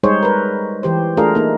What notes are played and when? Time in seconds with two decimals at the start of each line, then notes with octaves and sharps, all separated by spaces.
0.03 G3 G#3 D#4 G#4 C5 C#5
0.23 A#4 B4
0.83 E3 G4 C5
1.17 A3 D4 F4 G#4 A#4 F5
1.35 A#3 D#4